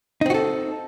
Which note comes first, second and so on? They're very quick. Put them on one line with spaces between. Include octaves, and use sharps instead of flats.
D#4 C4 F#4 A4